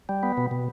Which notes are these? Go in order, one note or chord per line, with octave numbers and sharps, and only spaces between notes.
G3
B3
B2
B2